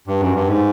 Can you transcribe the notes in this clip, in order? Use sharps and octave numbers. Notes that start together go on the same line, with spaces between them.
G2
F#2
G2
G#2